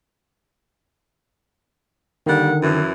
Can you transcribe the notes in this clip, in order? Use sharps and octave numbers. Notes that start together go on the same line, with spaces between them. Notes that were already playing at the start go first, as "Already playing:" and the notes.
D3 D#3 G3 A#3 F#5
F#2 E3